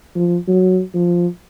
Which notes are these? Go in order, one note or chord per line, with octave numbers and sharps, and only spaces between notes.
F3
F#3
F3